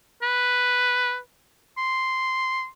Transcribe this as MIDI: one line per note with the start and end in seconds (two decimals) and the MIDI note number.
0.22 1.18 71
1.77 2.67 84